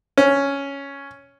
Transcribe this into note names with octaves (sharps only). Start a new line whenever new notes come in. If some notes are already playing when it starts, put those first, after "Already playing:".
C#4